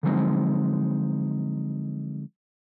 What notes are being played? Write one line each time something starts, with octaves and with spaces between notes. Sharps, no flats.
D3 F3 F#3 G#3 C4 D#4